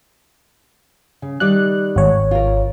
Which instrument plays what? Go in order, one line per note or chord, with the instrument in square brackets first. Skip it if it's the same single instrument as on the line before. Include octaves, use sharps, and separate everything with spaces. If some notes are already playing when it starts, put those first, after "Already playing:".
[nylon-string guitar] C#3
[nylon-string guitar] D#3 G3 D5 [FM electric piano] F#6
[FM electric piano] G#1 C#5
[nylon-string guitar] F4 A#4